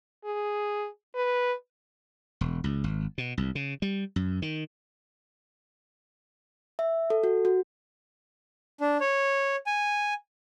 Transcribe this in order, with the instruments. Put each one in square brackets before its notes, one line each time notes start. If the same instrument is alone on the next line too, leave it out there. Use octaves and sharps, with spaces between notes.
[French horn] G#4
B4
[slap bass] E1
C#2
G#1
B2
C2
C#3
G3
F#2
D#3
[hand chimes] E5
A4
F#4
F#4
[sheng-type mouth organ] D4
C#5
G#5